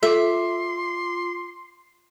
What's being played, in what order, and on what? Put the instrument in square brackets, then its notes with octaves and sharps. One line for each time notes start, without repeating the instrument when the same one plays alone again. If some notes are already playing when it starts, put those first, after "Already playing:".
[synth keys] F4 D6 [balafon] A4 [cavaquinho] E5 [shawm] C6